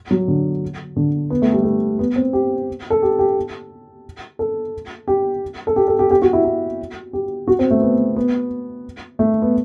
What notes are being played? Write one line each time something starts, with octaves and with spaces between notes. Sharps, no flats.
F#3
D3
D3
B3
A3
G3
A3
B3
C4
G4
A4
G4
G4
A4
G4
A4
G4
A4
G4
G4
F#4
E4
E4
G4
F#4
C4
A3
B3
B3
A3
B3